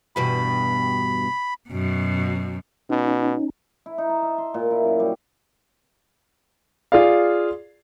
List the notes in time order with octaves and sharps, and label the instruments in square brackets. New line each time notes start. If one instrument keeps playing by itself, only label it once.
[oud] E2 G2 B2 [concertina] B5
[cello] F#2 B2
[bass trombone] B2 [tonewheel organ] C#4 D#4
[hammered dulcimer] E4
D#4
A5
E5
C6
A#2
E4
F#2
G3
[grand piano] F4 G#4 D5 F5